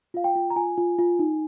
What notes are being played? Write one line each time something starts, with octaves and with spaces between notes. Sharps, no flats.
F4 F5
G5
F4
A#5
F4 G#5
F4
F4
D#4